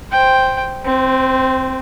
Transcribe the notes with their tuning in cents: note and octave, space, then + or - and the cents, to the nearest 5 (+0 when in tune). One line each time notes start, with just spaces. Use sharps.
C5 +0 G5 +0
C4 +0 C5 -30